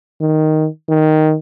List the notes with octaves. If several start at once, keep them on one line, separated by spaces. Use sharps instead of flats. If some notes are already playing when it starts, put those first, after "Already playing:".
D#3
D#3